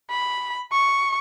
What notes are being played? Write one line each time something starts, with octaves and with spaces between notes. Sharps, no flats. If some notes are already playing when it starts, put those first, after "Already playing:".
B5
C#6